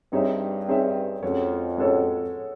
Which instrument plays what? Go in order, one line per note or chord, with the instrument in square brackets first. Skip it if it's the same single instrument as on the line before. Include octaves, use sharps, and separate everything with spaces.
[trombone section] G2 [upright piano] C4 D#4 G#4 C#5 E5
[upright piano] C4 D#4 G#4 C#5 E5
[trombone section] F2 [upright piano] G#3 C#4 F#4 A4 C#5
[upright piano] G#3 C#4 F#4 A4 C#5